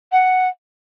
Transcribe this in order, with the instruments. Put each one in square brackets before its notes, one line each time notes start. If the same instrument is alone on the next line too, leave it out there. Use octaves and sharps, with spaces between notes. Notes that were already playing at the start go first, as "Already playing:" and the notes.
[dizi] F#5